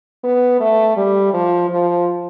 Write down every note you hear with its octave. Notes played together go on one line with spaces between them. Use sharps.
B3
A3
G3
F3
F3